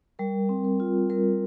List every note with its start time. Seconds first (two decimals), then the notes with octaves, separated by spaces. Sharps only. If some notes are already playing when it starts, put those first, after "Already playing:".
0.19 G3 A#4
0.49 C4
0.64 A#4
0.80 F4
1.10 G3 A#4